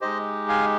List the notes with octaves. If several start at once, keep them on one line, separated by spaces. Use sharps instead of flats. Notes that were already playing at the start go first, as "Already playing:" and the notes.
G#3 D#4 G4 C5 D#5
F5 G#5